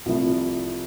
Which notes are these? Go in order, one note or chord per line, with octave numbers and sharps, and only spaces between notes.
C2 C3 F3 A3 E4